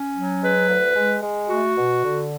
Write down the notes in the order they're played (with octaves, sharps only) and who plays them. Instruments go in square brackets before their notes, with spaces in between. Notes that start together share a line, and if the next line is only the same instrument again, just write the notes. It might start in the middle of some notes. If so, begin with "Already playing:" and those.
Already playing: [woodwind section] C#4
F#3
G#3 B4
D2
G#3
G#3
A3 F#4
B2
D3